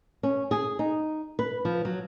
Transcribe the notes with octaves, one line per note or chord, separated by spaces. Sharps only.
C#4
G#4
D#4
B4
F3
F#3